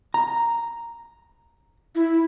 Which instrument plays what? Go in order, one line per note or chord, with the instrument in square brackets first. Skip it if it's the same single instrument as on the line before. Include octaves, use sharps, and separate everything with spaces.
[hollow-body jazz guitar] A#5
[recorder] E4